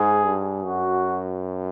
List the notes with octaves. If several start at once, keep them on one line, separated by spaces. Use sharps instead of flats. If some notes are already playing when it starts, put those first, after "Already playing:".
Already playing: G#2 G#4
G2
F#2 F#4